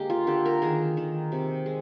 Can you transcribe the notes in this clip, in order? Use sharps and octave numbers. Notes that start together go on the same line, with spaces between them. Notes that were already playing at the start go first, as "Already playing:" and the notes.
Already playing: D3 G#3 A#3 G4 A#4
F4
D3 G4
A#4
D#3 G#4
D#3
C3
G#3